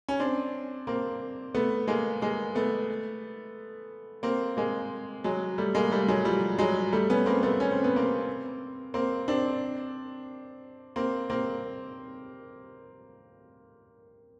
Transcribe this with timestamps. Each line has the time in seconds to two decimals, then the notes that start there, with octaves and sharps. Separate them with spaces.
0.09 C#4
0.20 C4 D4
0.87 A#3 C4
1.55 A3 B3
1.88 G#3 A#3
2.22 G#3 A#3
2.55 A3 B3
4.23 A#3 C4
4.57 G#3 A#3
5.24 F#3 G#3
5.58 G3 A3
5.75 G#3 A#3
5.91 G3 A3
6.08 F#3 G#3
6.25 F3 G3
6.59 F#3 G#3
6.92 G3 A3
7.10 B3 C#4
7.26 A#3 C4
7.43 A3 B3
7.60 C#4
7.72 C4
7.84 B3
7.96 A#3 C4
8.94 A#3 C4
9.28 C4 D4
10.96 A#3 C4
11.30 A#3 C4